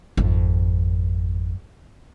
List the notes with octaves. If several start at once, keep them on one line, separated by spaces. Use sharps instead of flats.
G#1 F2